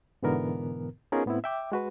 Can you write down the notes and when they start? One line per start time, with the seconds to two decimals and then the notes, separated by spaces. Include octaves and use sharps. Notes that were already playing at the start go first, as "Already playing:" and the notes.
0.23 G#2 B2 D3 E3 B3 A#4
1.12 B3 C#4 D#4 F4 G#4 A#4
1.26 A2 B3 C4 E4
1.44 E5 G5 D6
1.72 G#3 F#4 B4